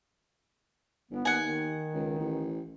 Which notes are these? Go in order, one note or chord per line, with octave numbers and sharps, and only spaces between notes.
G1 B3
D#2 F#5 G#5
D#3
C#2
A1